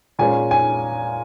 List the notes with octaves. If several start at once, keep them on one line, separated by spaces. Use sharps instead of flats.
A#2 G#3 C#4 G#5
G#5